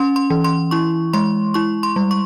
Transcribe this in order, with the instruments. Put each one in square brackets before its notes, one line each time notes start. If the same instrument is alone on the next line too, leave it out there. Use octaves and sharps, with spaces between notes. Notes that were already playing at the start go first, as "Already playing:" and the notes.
Already playing: [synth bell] C#4 C6
C6
E3
C6
E4 C#6
G#3 C6
E4 C#6
C6
G3
C#6